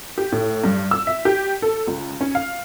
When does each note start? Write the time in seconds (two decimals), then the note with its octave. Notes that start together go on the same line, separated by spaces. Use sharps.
0.18 G4
0.32 A2
0.64 G2
0.91 E6
1.07 E5
1.25 G4
1.62 A4
1.87 C#2
2.21 C#4
2.35 F5